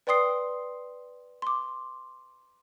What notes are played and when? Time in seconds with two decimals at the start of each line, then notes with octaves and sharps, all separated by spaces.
0.07 B4 D5 G5 C6 D#6 C7
1.42 C6 D6